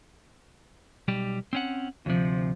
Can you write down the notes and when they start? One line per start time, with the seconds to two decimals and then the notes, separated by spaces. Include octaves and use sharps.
1.08 B1 G3 G4
1.53 C4 C#4 F#5
2.06 D2 C3 F3